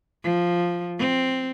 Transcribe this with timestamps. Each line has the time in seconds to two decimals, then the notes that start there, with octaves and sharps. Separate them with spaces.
0.23 F3
0.98 C4